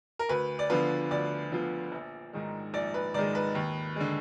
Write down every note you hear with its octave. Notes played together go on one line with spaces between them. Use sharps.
A#4
D2 B4
D5
D3 F3 B3 F4 B4
D2 D5
D3 F3 B3 F4
A#1
G#2 D#3 G#3
A#1 D5
B4
G#2 D#3 G#3 D5
B4
D#2
D3 G#3